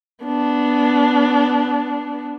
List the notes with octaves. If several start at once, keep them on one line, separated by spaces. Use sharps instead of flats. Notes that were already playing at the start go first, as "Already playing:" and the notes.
B3 D4